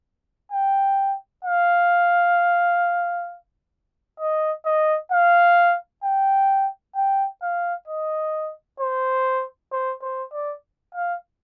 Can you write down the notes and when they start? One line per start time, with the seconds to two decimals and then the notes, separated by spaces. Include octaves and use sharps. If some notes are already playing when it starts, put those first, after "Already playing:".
0.52 G5
1.45 F5
4.20 D#5
4.66 D#5
5.12 F5
6.04 G5
6.96 G5
7.42 F5
7.88 D#5
8.80 C5
9.72 C5
10.02 C5
10.33 D5
10.95 F5